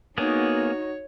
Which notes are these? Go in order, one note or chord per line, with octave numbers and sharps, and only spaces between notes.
A#3 B3 D#4 F#4 G#4 C#5